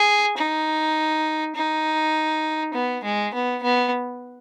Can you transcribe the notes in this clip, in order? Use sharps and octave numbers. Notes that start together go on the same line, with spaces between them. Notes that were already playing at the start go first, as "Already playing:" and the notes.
Already playing: G#4
D#4
D#4
B3
G#3
B3
B3